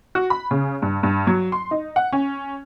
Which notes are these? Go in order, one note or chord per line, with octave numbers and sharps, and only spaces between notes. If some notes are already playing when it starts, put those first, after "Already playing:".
F#4
B5
C#3
G2
G2
F#3
C6
D#4
F#5
C#4